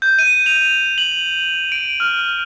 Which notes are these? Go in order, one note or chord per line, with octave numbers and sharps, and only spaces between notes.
G6
D#7
F7
F#7
D7
F6